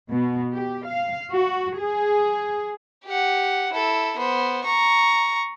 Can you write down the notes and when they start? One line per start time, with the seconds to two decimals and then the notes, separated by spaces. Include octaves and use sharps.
0.10 B2
0.54 G4
0.86 F5
1.32 F#4
1.78 G#4
3.05 G4 F#5
3.73 E4 A4
4.17 B3 C5
4.64 A#5 C#6